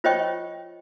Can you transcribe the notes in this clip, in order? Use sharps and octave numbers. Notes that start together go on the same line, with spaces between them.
F4 C5 C#5 D#5 G5 C#6